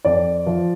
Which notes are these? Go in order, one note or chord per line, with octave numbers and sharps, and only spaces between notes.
F2 D5
F3